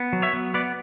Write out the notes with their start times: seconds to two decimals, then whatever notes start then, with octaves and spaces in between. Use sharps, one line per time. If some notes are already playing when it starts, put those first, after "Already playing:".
Already playing: B3
0.13 F#3
0.22 C#5 E5
0.33 B3
0.54 B3 B4 D5